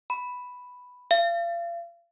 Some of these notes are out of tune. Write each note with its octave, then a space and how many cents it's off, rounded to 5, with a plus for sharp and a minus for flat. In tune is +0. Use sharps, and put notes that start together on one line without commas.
B5 +0
F5 -35